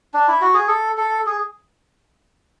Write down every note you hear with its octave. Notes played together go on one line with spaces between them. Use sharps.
D4
E4
F#4
G#4
A4
A4
G#4